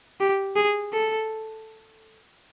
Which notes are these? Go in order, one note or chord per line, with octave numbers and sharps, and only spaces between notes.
G4
G#4
A4